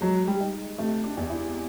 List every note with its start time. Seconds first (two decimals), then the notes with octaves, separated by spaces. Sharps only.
0.01 F#3 G#3
0.28 G3
0.41 D#4
0.79 C3 A3
1.04 D4
1.17 E2
1.30 E4